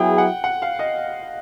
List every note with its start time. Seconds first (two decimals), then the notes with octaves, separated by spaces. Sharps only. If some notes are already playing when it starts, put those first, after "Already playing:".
Already playing: F#3 B3 E4 G#4 G5
0.18 F#5
0.44 F#5
0.62 F5
0.79 D#5